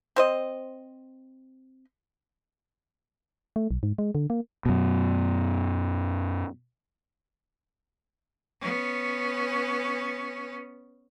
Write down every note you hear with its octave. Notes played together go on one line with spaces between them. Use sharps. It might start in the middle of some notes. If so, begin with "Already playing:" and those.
C4 C5 D#5
A3
B1
G#2
G#3
D3
A#3
F#2 B2
B3 C#4